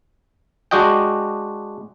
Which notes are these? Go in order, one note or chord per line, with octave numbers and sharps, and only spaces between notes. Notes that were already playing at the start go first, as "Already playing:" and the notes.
G#3 D4 F#4 D#5 G5